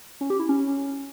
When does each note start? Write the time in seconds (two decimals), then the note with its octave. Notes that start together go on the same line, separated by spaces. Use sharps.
0.21 C#4
0.30 G4
0.40 E4
0.49 C#4